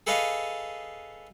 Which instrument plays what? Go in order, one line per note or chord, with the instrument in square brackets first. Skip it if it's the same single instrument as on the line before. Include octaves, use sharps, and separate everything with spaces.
[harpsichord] G#4 A4 B4 C#5 D#5 F5